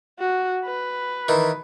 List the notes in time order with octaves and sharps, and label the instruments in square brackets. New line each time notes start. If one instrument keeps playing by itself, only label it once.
[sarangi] F#4
B4
[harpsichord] D#3 E3